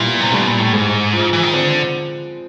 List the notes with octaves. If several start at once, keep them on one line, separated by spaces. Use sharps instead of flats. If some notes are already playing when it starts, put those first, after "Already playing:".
Already playing: A#2 G3 B3 E4
C3
B2 G3
A#2
A2
G#2 G#3
F3
E3
D#3
D3 C4